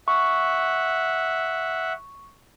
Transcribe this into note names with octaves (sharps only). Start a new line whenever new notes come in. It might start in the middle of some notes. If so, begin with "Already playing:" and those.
E5 F#5 C#6